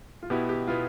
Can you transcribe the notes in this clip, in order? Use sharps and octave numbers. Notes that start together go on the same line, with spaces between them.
F4
B2 B3 E4 G4
G4
B2 B3 E4 F4